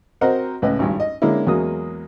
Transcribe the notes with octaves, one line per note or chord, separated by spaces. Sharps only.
C4 F#4 A#4 C5 D#5 F#5
C#2 A2 B4 D#5
G#1 G2
D#5
D3 G#3 A#3 C#4 E4
E2 F#3 G#3 A#3 D#6